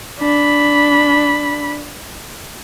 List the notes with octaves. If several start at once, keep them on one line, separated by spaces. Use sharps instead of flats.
D4 B5